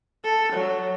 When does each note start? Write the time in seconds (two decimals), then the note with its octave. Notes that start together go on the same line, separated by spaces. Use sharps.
0.24 A4
0.53 F#3